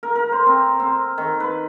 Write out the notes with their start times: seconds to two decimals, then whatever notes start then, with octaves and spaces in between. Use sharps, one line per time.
0.03 A#4
0.16 A#4
0.32 C5
0.46 C4
0.80 C4
1.18 D#3
1.40 B4